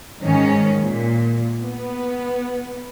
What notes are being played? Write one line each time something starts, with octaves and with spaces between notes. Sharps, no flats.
G#2 D#3 C#4
A#2
B3